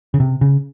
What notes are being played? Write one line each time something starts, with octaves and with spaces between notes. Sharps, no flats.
C#3
C3
C#3